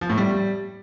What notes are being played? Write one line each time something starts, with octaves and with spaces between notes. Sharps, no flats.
F3
A2
G3